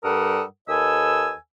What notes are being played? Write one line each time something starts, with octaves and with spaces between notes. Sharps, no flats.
G2 G3 A4 A#4 F#5 D#6
D#2 A4 B4 D#5 G#5 E6